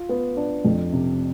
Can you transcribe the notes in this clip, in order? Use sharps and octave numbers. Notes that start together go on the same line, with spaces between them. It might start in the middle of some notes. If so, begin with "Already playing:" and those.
Already playing: F4
B3
D4
F2
C3